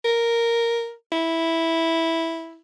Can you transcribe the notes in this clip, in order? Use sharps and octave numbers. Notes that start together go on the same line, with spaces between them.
A#4
E4